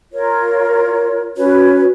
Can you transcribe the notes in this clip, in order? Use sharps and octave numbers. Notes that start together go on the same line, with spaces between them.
F4 A#4 C#5
C#4 F#4 B4 C#5